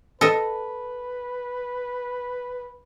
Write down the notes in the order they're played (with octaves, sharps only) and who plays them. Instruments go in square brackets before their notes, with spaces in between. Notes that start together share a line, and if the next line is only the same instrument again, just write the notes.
[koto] A4 D#5 [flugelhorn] B4